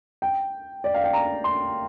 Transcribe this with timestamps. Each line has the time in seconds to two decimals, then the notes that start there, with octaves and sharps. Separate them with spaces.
0.22 G5
0.84 D5
0.94 F5
1.04 G5
1.13 A#5
1.44 C6